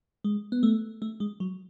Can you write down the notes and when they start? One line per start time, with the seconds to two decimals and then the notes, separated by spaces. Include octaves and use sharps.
0.24 G#3
0.52 B3
0.63 A3
1.02 A3
1.20 G#3
1.40 F#3